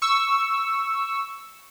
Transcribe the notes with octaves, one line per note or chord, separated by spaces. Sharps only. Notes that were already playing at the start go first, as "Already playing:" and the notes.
C#6 E6